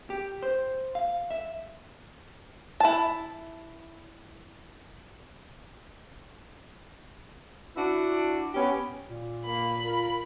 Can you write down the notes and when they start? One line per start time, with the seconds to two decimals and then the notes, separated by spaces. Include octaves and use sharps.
0.10 G4
0.43 C5
0.95 F5
1.31 E5
2.80 E4 A5
7.76 D4 E4 F#4
8.54 B3 C#4 G4
9.09 A#2
9.45 A#3 B5
9.83 F4 A#4